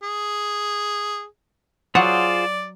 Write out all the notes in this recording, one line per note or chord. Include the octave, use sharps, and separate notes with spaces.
G#4
F#3 F4 F#4 G#4 C5 D5 F#5